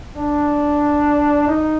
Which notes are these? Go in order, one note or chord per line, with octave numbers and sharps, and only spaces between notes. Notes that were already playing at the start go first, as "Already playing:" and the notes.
D4
D#4